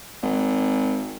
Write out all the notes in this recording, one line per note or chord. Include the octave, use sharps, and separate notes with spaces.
G#1